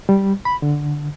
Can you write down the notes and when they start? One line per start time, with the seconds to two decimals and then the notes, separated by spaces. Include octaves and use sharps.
0.09 G3
0.45 B5
0.62 D3